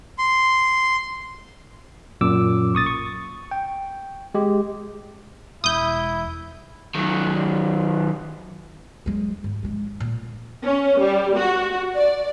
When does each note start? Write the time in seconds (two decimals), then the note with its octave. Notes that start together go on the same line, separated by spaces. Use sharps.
0.18 C6
2.21 F#2 A#2 D6 E6
2.74 B1 C#6 D#6 A6
2.86 C#6
3.51 G5
4.34 G#3 G4
5.64 E1 E4 D#6 G6
6.95 D#3 F#3
9.06 F#3 G#3
9.44 G#2
9.63 F3 G#3
10.00 A#2
10.63 C#4
10.98 G3
11.36 F#4
11.95 D5